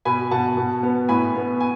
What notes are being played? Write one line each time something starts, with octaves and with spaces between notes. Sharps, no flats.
B2 G#5 B5
B2 F#5 A5
B2
B3
A2 G#5 B5
B3
G#5